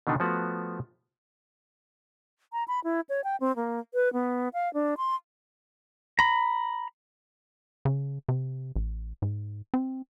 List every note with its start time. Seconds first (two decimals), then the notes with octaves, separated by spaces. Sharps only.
0.07 B2 D3 D#3 D4 D#4
0.20 F3 A3 B3 F#4
2.53 A#5
2.68 B5
2.84 E4
3.09 C#5
3.24 G5
3.40 C4
3.56 A#3
3.94 B4
4.13 B3
4.53 F5
4.74 D4
4.97 C6
6.19 A#5 B5
7.85 C#3
8.29 C3
8.76 A1
9.22 G#2
9.74 C4